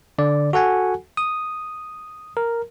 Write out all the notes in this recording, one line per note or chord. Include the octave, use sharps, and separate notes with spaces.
D3 D5
F#4 A4 F#5 G#5
D#6
A#4